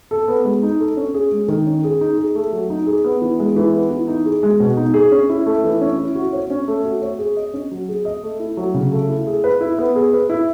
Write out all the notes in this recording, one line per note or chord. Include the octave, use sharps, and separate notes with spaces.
A4
B3
G#3
D#4
A4
C#4
G#4
G#3
D#3
C#4
G#4
D#4
G#4
A3
F#3
D#4
G#4
B3
E3
G#3
E3
B3
E3
D#4
G#4
G#3
B2
D#4
G#4
C#4
E4
A3
E3
C#4
E4
F#4
C#5
C#4
A3
F#4
C#5
G#4
D#5
C#4
F#3
G#4
D#5
A3
E4
F#3
C#3
A3
E4
G#4
B4
E4
B3
G#4
B4
E4